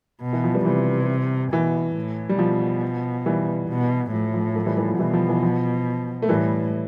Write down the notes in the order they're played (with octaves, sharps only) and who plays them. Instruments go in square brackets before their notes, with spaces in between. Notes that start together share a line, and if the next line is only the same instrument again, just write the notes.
[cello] B2
[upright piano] E3
F3
G3 B3
[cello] C3 [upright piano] E3 G3
[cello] B2 [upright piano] E3
[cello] A2
[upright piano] G3
[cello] B2 [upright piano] F3
[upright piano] E3 G3
[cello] B2
[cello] A2 [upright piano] F3
[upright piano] F3
F3 A3
E3 G3
E3 G3
F3
[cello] B2 [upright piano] E3 G3
[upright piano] F3
E3
F3
A3
[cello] A2 [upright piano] E3 G3